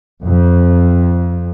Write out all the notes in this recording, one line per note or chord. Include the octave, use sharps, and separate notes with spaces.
F2